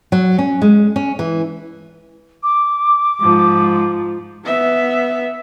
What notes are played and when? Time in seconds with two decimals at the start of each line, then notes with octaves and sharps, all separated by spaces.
0.12 F#3
0.38 C#4
0.62 G#3
0.96 C#4
1.19 E3
2.43 D6
3.22 G#2 F3
4.45 B3 E5